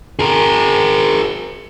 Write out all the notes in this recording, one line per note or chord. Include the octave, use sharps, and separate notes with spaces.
G#4 A#4